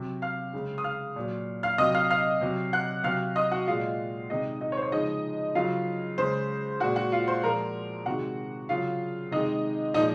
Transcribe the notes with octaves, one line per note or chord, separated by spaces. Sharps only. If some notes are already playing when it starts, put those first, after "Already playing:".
Already playing: C3 F#3
F5 F6
C#3 G#3
D#6
F5 F6
A#2 F#3
F5 F6
C3 F#3 D#5 D#6
F5 F6
F5 F6
C3 F#3
F#5 F#6
C3 F#3 F5 F6
D#5 D#6
F#4 F#5
A#2 G#3 F4 F5
C3 D#3 G#3 D#4 D#5
D#4 D#5
C#5
C5
C#5
C#3 F3 G#3 D#4 D#5
C#3 F#3 F4 F5
C#3 G#3 C5
A#2 G#3 F#4 F#5
F#4 F#5
F4 F5
C5 C6
A#2 F3 G#3 A#4 A#5
C3 D#3 G#3 F#4 F#5
C#3 F#3 F4 F5
C3 D#3 G#3 D#4 D#5
A#2 F3 G#3 D#4 D#5